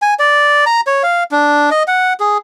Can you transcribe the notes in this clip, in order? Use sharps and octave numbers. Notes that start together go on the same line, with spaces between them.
G#5
D5
A#5
C#5
F5
D4
D#5
F#5
G#4